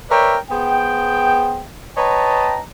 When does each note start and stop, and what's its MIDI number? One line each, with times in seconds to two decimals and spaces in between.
0.10 0.37 70
0.10 0.37 71
0.10 0.37 73
0.10 0.37 74
0.10 0.37 76
0.10 0.37 79
0.50 1.64 59
0.50 1.64 68
0.50 1.64 72
0.50 1.64 79
1.97 2.60 71
1.97 2.60 73
1.97 2.60 75
1.97 2.60 79
1.97 2.60 81
1.97 2.60 82